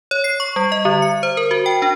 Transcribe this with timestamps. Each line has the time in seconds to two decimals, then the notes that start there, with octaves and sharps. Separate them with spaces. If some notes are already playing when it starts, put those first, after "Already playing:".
0.11 C#5
0.24 C7
0.40 C#6
0.56 G3
0.72 D#5
0.85 D3
1.02 C#7
1.23 C5
1.37 A#4
1.51 F#4
1.66 G5
1.82 D4